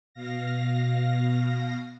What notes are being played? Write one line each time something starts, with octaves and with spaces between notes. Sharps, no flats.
B2 F5 A#6